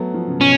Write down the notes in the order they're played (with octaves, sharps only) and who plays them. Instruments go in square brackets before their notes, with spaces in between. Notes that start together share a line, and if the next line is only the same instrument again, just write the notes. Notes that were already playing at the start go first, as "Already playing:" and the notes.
Already playing: [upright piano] F#3 A3 B3
F3
C#3
[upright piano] B2 [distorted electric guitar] C#4